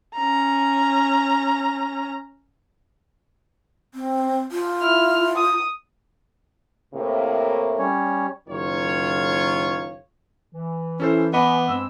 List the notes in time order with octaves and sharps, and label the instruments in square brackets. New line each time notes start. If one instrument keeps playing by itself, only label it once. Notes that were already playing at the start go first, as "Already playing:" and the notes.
[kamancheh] C#4 A#5
[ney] C4
F4
[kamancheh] E4 F6
D#6
[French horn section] A2 C3 A#3
[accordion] G3 C#4 C#5
[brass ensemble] F#1 D#3 F4 C#5
[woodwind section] E3
[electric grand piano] C#4 A4 C5 [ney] E4
[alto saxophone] B3 [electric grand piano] D#5 B5 D6 [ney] G#5
[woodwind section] G2 G#3 E6 [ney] C4